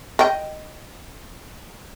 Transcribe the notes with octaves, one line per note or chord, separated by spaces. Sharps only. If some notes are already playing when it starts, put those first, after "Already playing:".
D#5 G5